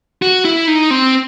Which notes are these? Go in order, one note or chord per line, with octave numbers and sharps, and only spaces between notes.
F#4
E4
D#4
C4